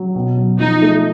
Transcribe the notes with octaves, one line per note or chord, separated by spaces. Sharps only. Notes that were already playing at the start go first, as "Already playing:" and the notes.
Already playing: F#3
B2
F#3
F3 D#4
A3